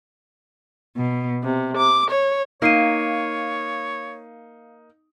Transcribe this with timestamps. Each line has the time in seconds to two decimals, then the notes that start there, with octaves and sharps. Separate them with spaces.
0.97 B2
1.43 C3
1.76 D6
2.10 C#5
2.62 A#3 D#4 C#5 F5 C7 D#7